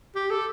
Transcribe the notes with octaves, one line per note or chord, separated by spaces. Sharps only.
G4
A4